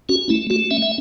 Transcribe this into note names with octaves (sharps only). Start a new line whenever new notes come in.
C#4 F#4
A3 E4
A3 F#4
C#4 E5
E5